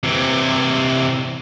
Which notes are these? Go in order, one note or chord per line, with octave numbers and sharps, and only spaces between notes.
C3 E3